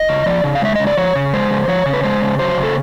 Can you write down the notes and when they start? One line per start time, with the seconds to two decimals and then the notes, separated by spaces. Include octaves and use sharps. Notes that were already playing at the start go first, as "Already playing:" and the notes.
Already playing: D#5
0.09 C#3
0.26 F3 D5
0.44 C#3
0.55 F5
0.62 G#3 E5
0.76 C#3 D#5
0.87 D5
0.97 F3 C#5
1.16 C#3
1.33 G#3 C5
1.50 C#3
1.68 F3 C#5
1.86 C#3
1.93 B4
2.03 G#3 C5
2.22 C#3
2.39 F#3 C5
2.57 C#3
2.63 A4